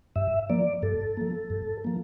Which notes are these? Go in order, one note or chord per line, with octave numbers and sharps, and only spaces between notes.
G2 E5
F3 A#3 D5
G2 A4
F3 A#3
G2
F3 A#3